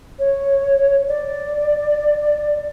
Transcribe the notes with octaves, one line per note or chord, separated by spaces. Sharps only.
C#5
D5